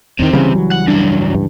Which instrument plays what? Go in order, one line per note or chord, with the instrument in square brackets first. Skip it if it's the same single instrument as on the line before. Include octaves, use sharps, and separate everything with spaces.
[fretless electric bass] E2 D#3 [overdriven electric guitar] C3 C4
[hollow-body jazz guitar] C#2 E3 G3 [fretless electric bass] C#3
[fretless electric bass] F#3
[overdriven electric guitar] F#5
[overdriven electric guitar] G2 F#3 [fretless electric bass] D4
[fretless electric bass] G2